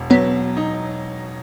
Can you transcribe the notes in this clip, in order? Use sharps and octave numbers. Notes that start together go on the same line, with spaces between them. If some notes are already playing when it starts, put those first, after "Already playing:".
Already playing: E1
F#3 B3
D#4